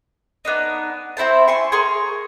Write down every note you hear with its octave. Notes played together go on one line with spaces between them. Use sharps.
B3 D4 D#4
C4 E4 C5 A5
G#5 C6 C#6
G#4 A#4 C6 C#6